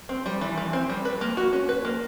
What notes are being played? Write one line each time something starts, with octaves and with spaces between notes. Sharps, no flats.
C4
G3
E3
E3
C4
G3
B4
A#3
F#4
C#4
B4
A#3